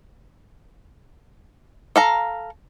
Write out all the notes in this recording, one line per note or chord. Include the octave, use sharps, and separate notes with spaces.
A4 F5 A#5